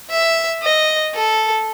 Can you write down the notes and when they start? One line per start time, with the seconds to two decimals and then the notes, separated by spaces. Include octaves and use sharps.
0.10 E5
0.63 D#5
1.15 A4